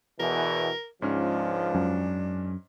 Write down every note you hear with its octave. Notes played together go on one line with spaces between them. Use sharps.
E2 B2 E3 A#4
C#2 G#2 F3 C#4 D4 F6
F#2